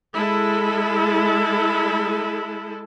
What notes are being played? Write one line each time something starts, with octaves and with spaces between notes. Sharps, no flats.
G#3 E4 A4